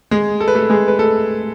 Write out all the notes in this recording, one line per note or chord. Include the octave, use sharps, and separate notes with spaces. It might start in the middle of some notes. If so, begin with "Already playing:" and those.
G#3 G#4
A4
B4
A3 A4
G#3 G#4
B4
A3 A4